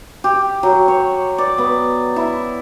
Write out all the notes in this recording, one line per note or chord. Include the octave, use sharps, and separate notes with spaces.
G4
F#3
C#5
D5
B3
E4